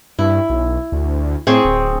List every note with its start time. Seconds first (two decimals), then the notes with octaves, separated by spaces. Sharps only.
0.19 G2 E4
0.50 B1
0.92 D2
1.47 A2 C4 G#4 C#6
1.65 D1